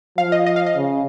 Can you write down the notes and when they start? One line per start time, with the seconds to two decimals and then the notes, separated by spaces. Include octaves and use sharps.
0.18 F3 F5
0.32 D#5
0.46 D#5
0.56 F5
0.67 D#5
0.76 C#3